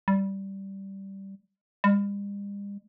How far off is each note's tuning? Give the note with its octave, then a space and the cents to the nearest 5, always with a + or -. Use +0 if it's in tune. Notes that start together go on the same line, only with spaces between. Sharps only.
G3 -10
G3 +45